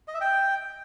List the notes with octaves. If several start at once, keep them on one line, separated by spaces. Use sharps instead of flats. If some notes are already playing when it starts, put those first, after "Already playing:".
D#5
E5
G5